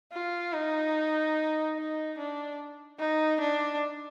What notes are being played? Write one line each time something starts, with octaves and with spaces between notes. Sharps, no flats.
F4
D#4
D#4
D4
D#4
D4